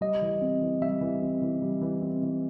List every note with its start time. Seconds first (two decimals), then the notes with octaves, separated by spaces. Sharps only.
0.01 G3 D#5
0.22 E3
0.41 C4
0.61 E3
0.82 G3 E5
1.01 E3
1.22 C4
1.42 E3
1.62 G3
1.81 E3
2.02 C4
2.22 E3